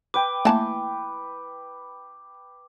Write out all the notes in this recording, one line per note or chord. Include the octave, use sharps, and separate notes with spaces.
B4 G5 D6
E3 A3 A#3 A5